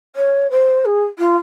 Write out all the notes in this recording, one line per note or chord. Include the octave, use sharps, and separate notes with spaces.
C#5
C5
G#4
F4